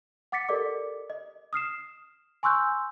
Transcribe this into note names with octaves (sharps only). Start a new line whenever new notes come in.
F#5 D6 A6 B6 C#7
G4 A4 A#4 D5 D#5 D6
D#5
D#6 F6 C7 E7
G#5 C6 C#6 E6 F#6 G6